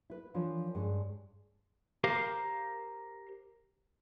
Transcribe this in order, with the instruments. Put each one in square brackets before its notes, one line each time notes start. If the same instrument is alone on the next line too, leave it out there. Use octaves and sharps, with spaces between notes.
[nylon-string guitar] E4 B4
E3 F3 D4 F4 A#4 C#5
G2 G#3 C#4
[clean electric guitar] G4 A#4 C5 F5